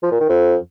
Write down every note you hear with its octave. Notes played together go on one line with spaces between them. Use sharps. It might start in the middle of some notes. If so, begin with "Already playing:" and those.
F3
A#2
D#3
F2